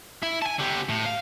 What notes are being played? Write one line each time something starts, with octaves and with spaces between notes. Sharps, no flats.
E4
G#5 A5
D3 G4
A2
F5